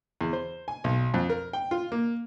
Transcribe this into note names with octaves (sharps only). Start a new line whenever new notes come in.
E2
C5
G#5
B1
F2
A#4
G5
F4
A#3